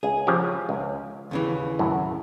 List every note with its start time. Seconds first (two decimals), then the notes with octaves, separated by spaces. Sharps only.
0.03 C#2 G#4
0.27 C#3 F3 G4
0.69 C#2
1.31 D#2 C#3 E3
1.79 F#2 A2